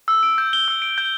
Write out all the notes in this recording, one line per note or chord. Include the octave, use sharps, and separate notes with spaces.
E6
D7
G6
G7
E6
D7
G6